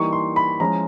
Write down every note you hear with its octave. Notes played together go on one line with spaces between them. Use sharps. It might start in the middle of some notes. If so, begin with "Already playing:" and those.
Already playing: E3 G3 A#3 D#4 C#6
C6
B5
F3 G#3 C#4 E4 A#5